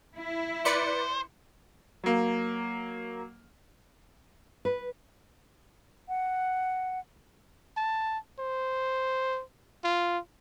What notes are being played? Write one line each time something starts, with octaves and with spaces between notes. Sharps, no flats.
E4
B4 C5 D5 C#7
F#3 A#3
B4
F#5
A5
C5
F4